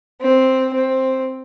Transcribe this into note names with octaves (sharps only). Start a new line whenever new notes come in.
C4
C4